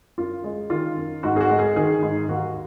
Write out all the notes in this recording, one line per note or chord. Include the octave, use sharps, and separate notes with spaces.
F#2 F4
G#3
D#3 F4
F#2
G#2 F#4
G#4
F#4
G#3
G#4
D#3 G#4
G#2
D#2 F#4